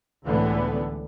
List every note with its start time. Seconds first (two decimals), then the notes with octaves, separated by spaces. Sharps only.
0.24 C#2 A2 D3 E3 G3 B3